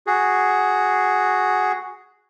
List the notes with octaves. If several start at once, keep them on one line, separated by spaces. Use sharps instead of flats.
F#4 G#4